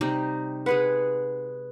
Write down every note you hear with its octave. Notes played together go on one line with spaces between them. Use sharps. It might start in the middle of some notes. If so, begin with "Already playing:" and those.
C3 G3 D#4
G#3 G#4 B4 F#5